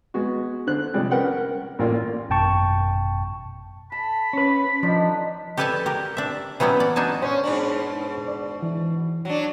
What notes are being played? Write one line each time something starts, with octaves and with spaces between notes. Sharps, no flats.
G#3 B3 F#4
D3 C5 F#6
C3 F3 G3 G#3
C#4 A#4 B4 F#5 G5
A#4
A1 G3 A#3 F4 D5
G#1 F#2 B2 G5 A5 C#6
A5 B5
C#4 B4
F3 D4 D#4 D#5
G4 A4 B4 D5 G#5 A5
G4 A#4
D4 E5
E3 F#3 G3 B3 C#4
D5
D4 D#4 F#4 G#5 A5
C#4 C5 C#5
G#2 B2 D4
D5
E3
F#3 D4